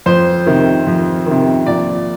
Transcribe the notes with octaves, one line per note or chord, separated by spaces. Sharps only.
F2 C5
C3 D#3
F2
D#3
C3
A#1 D5